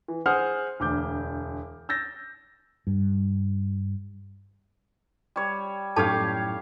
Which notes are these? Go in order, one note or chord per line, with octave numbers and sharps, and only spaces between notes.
E3
G#4 C5 F#5 G#5 D#6 F6
E1 D2 D6 G6
E6 G6 A6 A#6
G2
G3 C#5
F#2 A2 D#4 G4 A4 C#5 F5 A5